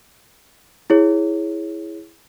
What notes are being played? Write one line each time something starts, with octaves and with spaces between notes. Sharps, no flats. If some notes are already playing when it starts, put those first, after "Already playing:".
E4 G#4 C#5